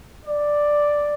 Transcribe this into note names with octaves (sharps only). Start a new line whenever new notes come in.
D5